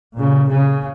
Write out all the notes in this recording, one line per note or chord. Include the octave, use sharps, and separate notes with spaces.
A#2 C#3
C#3